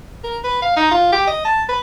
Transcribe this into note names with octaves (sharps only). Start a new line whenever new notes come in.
A#4
B4
F5
D#4
F4
G4
D#5
A5
B4